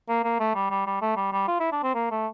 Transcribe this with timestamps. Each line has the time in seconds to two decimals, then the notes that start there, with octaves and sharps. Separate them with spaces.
0.09 A#3
0.24 A#3
0.40 A3
0.55 G3
0.71 G3
0.87 G3
1.02 A3
1.17 G3
1.33 G3
1.48 F4
1.60 E4
1.72 D4
1.83 C4
1.95 A#3
2.11 A3